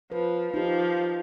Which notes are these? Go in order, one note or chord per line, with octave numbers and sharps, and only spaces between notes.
F3 B4
F3 D#4 G4